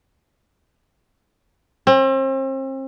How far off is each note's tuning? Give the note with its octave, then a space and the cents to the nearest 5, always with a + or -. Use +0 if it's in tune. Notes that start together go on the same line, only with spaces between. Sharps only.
C4 +40